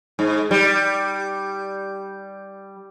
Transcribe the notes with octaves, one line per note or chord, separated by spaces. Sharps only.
G#2
G3